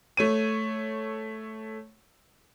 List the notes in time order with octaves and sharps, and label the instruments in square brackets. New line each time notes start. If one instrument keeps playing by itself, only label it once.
[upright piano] A3 C#5 D#7